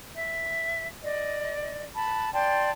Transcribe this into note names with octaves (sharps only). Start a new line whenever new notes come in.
E5
D5 D#5
A5 B5
D5 G5 A5 C6